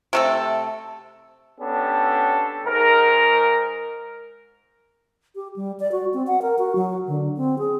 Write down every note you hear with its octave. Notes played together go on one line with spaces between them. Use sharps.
C3 A3 A4
B3 C#4 D4 G4 A4
G#2 A#4
G4
G3
D5
F#4
C4
F#5
A#4
F#4
F#3
D3
C4
G#4